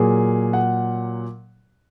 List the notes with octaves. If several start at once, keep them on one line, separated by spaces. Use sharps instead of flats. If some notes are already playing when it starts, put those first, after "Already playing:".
Already playing: A#2 F#3 A#3 G#4
F#5